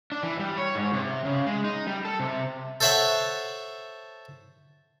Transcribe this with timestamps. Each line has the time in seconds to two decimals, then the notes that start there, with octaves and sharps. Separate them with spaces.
0.12 D4
0.23 E3
0.40 G3
0.58 C#5
0.75 G#2
0.94 C3
1.25 C#3
1.46 G#3
1.64 D#4
1.87 G3
2.05 A4
2.19 C3
2.81 A4 C5 C#5 E5 F#5 A5